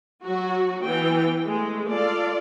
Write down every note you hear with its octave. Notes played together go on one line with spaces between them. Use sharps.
F#3 F#4
E3 B3 G5
G#3 A3
F4 A4 D5 F5